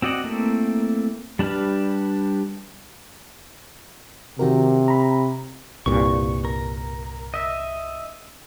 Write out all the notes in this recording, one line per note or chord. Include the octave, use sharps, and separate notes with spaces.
C4 F#4 D5 D#5 F#5
A3 A#3 C4 E4
G3 D4 G4 B4 F6
C3 D#3 F#4 A#4
A#5 B5
C2 G2 A#2 C#6
A#4
D#5 E5